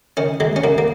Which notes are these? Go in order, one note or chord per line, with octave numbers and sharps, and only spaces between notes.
D#3 C#4
D#2 G#3
C#4
D#2 A#3
A#3